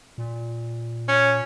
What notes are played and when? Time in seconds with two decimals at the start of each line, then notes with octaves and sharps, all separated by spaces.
0.18 A#2
1.08 C#4